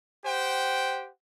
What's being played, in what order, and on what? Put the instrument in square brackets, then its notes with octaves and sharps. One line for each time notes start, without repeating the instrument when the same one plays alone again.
[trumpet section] G4 C5 F#5 G5